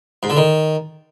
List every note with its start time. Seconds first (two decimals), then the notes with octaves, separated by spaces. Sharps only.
0.23 G#2
0.30 D3
0.37 D#3